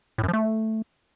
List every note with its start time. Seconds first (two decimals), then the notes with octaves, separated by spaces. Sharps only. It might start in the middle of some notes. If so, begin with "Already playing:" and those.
0.18 A2
0.23 F#2
0.28 F3
0.33 A3